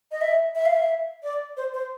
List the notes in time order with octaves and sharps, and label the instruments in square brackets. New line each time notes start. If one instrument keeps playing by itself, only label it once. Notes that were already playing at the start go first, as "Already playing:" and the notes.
[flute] D#5
E5
E5
F5
E5
D5
C5
C5